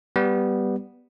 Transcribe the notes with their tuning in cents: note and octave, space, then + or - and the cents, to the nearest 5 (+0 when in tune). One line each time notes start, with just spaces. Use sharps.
G3 +0 B3 +0